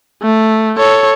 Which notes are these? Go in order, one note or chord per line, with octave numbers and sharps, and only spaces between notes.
A3
A4 C#5